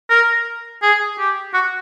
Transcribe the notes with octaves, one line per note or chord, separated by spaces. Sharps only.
A#4
G#4
G4
F#4